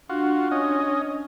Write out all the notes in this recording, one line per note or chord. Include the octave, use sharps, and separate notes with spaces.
D4 F4 F#4
C#4 D#5